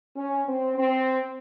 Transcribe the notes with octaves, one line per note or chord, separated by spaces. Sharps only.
C#4
C4
C4